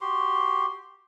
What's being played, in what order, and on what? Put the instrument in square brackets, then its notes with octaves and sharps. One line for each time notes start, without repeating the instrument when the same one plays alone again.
[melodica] F#4 G4 C6